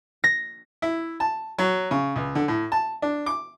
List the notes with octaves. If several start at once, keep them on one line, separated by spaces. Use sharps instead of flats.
A#6
E4
A5
F#3
C#3
C#2
D3
A2
A5
D4
D6